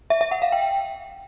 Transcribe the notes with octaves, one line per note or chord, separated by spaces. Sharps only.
E5
E5
F#5
F5
G5